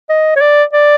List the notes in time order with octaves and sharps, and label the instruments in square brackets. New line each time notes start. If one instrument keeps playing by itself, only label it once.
[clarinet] D#5
C#5
D5
D5